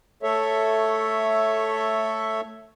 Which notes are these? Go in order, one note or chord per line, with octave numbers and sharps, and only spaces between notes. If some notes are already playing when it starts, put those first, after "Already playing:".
A3 A4 C#5 E5